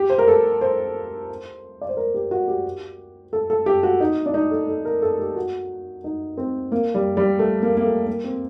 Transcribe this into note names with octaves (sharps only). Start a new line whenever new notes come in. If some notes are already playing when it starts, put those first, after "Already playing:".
Already playing: G4
C5
A#4
A4
C5
D5
C5
A#4
G4
F#4
G4
A4
A4
G4
F#4
D#4
D4
D#4
A4
A4
A#4
A4
G4
F#4
D#4
C4
A#3
G3
G3
A3
A#3
A#3
A3
A#3
C4